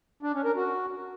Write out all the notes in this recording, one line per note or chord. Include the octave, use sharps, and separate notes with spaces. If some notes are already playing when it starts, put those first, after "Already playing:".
D4
C#4
A#4
F#4